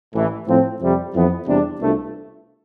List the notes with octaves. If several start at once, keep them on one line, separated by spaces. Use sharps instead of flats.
A1 A2 E3
A2 F3 C4
F2 C3 G3
F2 E3 B3
E2 C3 G3 D4
C2 B2 A3 D4 F4